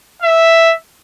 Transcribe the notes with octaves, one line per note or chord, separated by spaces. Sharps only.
E5